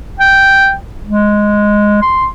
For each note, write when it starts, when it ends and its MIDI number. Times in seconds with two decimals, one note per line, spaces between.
0.20 0.72 79
1.06 2.01 56
2.02 2.26 84